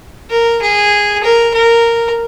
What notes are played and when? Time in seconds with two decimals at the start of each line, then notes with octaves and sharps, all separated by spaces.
0.30 A#4
0.62 G#4
1.23 A#4
1.53 A#4